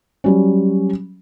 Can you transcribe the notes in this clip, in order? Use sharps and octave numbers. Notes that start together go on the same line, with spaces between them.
F#3 G3 C#4